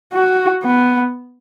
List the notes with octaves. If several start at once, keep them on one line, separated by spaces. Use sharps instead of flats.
F#4
B3